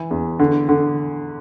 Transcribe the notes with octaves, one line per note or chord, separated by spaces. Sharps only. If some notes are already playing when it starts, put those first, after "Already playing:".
Already playing: E3
E2
D3
D3